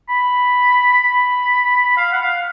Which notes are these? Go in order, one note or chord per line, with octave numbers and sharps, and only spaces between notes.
B5
B5
F5
F#5
F5